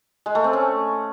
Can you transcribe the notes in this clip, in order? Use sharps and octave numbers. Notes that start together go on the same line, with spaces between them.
G#3
A3
C4
C#4